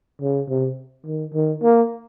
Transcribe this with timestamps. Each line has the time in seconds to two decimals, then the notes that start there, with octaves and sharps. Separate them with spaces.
0.22 C#3
0.49 C3
1.06 D#3
1.34 D#3
1.62 A#3